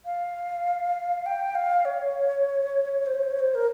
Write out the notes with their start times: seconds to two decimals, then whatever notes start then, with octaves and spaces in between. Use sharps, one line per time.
0.05 F5
1.26 G5
1.55 F5
1.85 C#5
3.06 C5
3.15 C#5
3.23 C5
3.31 C#5
3.39 C5
3.55 A#4